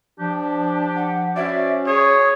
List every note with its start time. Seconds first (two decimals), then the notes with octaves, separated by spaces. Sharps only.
0.20 F3 D4 G4
0.96 F#5
1.36 C#4 F#4 C5 D5 E5
1.87 G#4 C#5 D#6